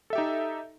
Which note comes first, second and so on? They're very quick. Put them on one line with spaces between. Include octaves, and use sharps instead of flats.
A4 E5 G4 D#4